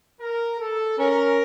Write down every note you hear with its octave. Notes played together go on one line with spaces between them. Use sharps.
A#4
A4
C#4 A#4